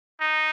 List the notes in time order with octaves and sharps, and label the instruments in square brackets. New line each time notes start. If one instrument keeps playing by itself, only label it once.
[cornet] D#4